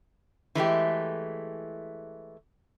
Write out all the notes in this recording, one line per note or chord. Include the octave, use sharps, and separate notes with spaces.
E3 G#3 A3 G4